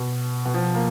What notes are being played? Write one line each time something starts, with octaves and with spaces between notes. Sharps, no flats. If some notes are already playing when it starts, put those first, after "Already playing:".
Already playing: B2
B2
F3
A#3